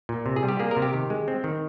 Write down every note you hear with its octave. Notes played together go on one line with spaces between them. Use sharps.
A#2
C3
G#4
G3
G4
A#3 G#4
A#4
C3
G4
D#3
G#3
C4
D#3